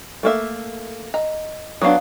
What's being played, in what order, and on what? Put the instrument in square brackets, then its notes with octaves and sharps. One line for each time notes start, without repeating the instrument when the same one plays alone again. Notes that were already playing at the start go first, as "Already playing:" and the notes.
[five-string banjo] A3 A#3 E5
[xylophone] D#5 [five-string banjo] A#5
[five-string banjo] F#3 B3 D4 [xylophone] F5 D#6